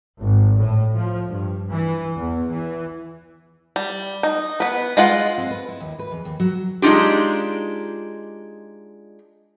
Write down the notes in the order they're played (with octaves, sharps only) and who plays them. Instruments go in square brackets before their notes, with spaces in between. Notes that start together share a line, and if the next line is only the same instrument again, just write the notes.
[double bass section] G#1
A2
F3
G2
E3
E2
E3
[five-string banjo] G3
D#4
B3 B4
G#3 F4 F#5
[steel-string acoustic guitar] C4
B4
E4
D#2
B4
E2
D#2
F#3
[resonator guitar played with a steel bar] G#3 D4 D#4 F4 G4